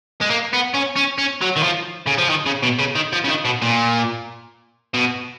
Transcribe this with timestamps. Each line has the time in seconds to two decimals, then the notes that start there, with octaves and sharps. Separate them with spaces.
0.21 G#3
0.30 A#3
0.53 B3
0.75 C#4
0.96 C#4
1.18 C#4
1.42 F#3
1.57 D#3
1.64 F3
2.07 C#3
2.18 F3
2.30 D#3
2.46 C#3
2.63 B2
2.79 C#3
2.95 D#3
3.13 F3
3.24 C#3
3.28 D#3
3.45 B2
3.62 A#2
4.94 B2